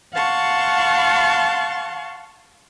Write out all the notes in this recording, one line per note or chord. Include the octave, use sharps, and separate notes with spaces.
F5 F#5 A5 C6 C#6